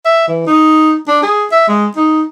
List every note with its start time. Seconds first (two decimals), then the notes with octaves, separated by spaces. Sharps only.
0.05 E5
0.28 E3
0.47 D#4
1.08 D4
1.23 G#4
1.52 E5
1.68 G#3
1.97 D#4